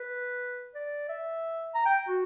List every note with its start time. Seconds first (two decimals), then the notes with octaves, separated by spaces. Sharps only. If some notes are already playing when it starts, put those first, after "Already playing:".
Already playing: B4
0.75 D5
1.09 E5
1.75 A#5
1.86 G5
2.08 F#4